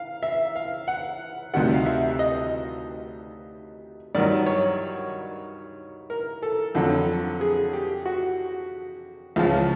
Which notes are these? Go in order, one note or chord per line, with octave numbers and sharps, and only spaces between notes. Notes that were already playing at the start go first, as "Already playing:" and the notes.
Already playing: F5
E5
F5
F#5
D2 C3 D#3 G3 F#5
F5
E5
D#5
G2 D#3 F#3 D5
C#5
A#4
A4
F2 D3 F#3
G#4
G4
F#4
C#2 C#3 F3